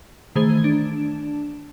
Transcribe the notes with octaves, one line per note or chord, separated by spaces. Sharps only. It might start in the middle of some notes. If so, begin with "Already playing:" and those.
D#3 E3 A3 G#4 C5 G#6
D4